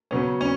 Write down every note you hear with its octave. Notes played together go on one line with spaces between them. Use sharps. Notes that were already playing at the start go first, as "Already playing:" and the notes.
C#3 F#3 B3 C#4
C#4